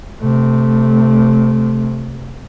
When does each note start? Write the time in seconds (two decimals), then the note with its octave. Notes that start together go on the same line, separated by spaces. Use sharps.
0.21 C3 A3